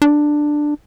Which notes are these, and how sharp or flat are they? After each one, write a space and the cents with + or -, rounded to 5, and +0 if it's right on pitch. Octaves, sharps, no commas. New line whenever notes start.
D4 +10